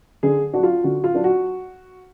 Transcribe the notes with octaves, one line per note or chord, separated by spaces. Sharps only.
D3 G#4
F#3 D4 F#4
F4
D3 F#4
F4
F#3 D4
F#4